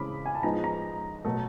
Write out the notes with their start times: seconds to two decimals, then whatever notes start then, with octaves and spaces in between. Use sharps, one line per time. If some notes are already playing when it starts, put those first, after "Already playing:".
Already playing: C#3 E3 G#3 C4 B5 D6
0.26 G#5
0.35 A5
0.43 F3 G#3 B3 D#4 A#5
0.64 A#5
1.25 B2 F#3 A3